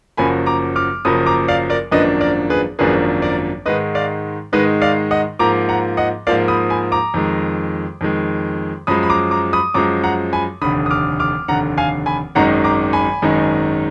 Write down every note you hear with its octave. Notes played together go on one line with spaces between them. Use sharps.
F#1 F#2 F3 A#3 G#5 B5
A#5 D6
D6 F6
F#1 F#2 F3 A#3 B5 D#6
A#5 D6
D5 F5
A#4 D5
G#1 F#2 F3 A#3 D4 B4 D#5
A#4 D5
G#4 B4
G#1 F#2 F3 A#3 D4 G#4 B4
A#4 D5
G#2 D#3 G#3 D#4 B4 D#5
D5 F5
G#2 D#3 G#3 D#4 B4 D#5
D5 F5
D#5 F#5
G#2 F3 A#3 A#5 D6
F#5 A#5
D#5 F#5
G#2 F3 A#3 D5 F5
B5 D#6
G#5 B5
A#5 D6
F2 D#3 G#3
F2 D#3 G#3
F#2 F3 G#3 B5 D#6
B5
A#5 D6
A#5 D6
B5 D#6
F#2 F3 G#3 A#5 D6
F#5 A#5
G#5 B5
F1 D#2 D3 B5 D#6
D#6
D6 F6
D6 F6
F1 D#2 D3 F#5 A#5
F5 G#5
G#5 B5
G#1 F#2 D#3 G#3 D#4 F#5 A#5
A#5 D6
G#5 B5
G#1 F#2 D#3 G#3 D#4